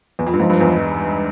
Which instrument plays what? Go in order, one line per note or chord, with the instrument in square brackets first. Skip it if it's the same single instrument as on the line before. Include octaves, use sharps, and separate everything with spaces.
[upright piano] E2
F2
G2
[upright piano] G#2 [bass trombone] F3
[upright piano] G2
E2